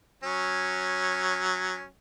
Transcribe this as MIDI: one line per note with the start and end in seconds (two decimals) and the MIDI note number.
0.23 1.87 54
0.23 1.87 61